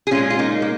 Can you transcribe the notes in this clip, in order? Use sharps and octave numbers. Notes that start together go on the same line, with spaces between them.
G#4
A#2 G#3 C#4 F4
F4
A#3 D#4
A#3